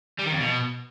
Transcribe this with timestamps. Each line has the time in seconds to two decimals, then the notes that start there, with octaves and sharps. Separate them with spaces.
0.19 G3
0.25 D#3
0.32 F2
0.39 B2